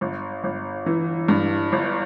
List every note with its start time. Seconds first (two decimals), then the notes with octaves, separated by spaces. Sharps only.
0.01 G1
0.44 G1
0.86 E3
1.28 G2
1.72 G1